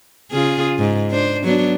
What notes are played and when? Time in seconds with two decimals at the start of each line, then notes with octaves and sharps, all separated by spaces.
0.32 C#3 F4 G#4
0.79 G#2
1.10 D4 C5
1.44 F#3 B3 D4